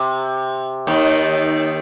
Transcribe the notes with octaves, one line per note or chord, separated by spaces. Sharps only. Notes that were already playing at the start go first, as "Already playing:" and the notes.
Already playing: C3
D#2 D#3